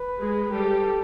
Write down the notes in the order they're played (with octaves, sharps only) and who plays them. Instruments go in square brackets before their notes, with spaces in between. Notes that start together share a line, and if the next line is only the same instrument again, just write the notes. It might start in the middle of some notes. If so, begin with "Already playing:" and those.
Already playing: [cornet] B4
[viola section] G#3 G#4
[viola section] G3 G4 [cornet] A4